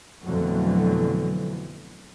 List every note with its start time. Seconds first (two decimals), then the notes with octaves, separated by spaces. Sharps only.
0.25 F2 B2 D3 E3 F#3 A3